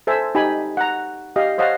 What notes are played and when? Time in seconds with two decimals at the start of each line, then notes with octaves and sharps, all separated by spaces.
0.07 A4 C5 E5 G#5
0.35 D#4 G4 G#5 B5
0.77 F#5 A#5
1.36 G4 D#5 F5
1.58 C5 C#5 D#5 F5 F#5 A5